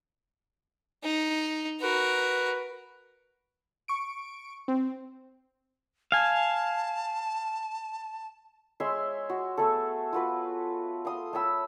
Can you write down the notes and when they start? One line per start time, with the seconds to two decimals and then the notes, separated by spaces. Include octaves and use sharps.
1.03 D#4
1.81 F#4 A#4 B4
3.88 C#6 D7
4.68 C4
6.12 F5 G#5 A5
8.80 G#3 C#5 E5 C6
9.29 F#4
9.57 A3 B3 G#4 A4
10.13 F4 F#4 B4
11.05 F5 C6 D#6
11.33 A3 C#5 B5 E6